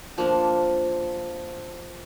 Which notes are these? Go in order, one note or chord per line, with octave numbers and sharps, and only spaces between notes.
F3 A#3 D4